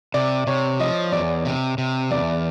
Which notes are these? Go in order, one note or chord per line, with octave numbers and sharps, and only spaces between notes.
C3 D5
C3 C#5
F3 D#5
E2 D5
C3
C3
E2 D5